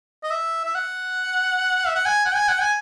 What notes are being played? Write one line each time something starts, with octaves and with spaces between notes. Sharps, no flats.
D#5
E5
E5
F#5
E5
F#5
G#5
F#5
G#5
F#5
G#5